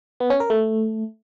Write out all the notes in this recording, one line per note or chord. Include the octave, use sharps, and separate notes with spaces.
B3
C#4
A#4
A3